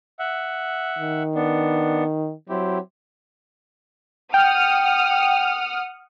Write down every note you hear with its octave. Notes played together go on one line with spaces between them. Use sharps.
E5 F#5
D#3
B3 D4
F#3 C4 E4 G4
F#5 G5 D#6 F6